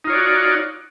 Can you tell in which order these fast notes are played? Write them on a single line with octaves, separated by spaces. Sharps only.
D#4 F4 C#5 D5 F#4